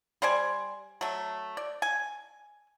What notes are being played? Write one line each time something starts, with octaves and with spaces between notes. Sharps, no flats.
G3 C5 D5 G#5
F#3 A3
D5
G#5